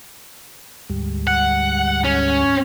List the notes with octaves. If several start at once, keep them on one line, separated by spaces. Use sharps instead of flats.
D2 G#2 G3
F#5
C#4